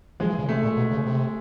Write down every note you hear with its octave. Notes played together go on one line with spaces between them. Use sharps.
F3 G#3
E3
C#3
C3 A3
A#2
B2
C#3
C3